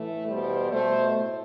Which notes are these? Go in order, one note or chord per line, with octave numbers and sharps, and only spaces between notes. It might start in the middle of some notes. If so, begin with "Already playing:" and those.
Already playing: A2 E3 A3
E2 B2 G3 C5
B2 A3 C5
A2